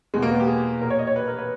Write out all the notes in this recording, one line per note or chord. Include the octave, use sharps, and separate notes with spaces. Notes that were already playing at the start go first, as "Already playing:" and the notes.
E2 B2 G#3
A#3
B3
G4
G#4
A#2 A#4
C#5
D#5
C#5
B4
A#4
B4